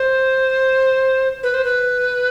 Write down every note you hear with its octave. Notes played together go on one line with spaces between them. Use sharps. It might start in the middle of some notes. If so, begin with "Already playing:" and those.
Already playing: C5
B4
C5
B4